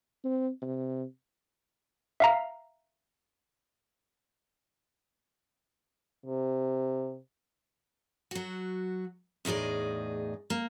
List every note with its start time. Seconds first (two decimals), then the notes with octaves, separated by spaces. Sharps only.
0.24 C4
0.62 C3
2.20 E5 F5 A#5
6.26 C3
8.31 F#3 F#4
9.45 E2 A2 D#4 G#4 D5
10.50 A#3